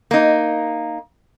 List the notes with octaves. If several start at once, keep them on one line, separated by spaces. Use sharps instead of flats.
A#3 D#4